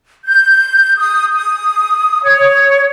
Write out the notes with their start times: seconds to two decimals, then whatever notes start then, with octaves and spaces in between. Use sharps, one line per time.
0.25 G6
0.98 D#6
1.34 D#6
2.23 C#5